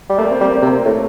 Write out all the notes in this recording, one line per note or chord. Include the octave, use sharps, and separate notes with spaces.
G3
A3 A#3
C4
G3 A#3
C4
C3
A#3
A2 A3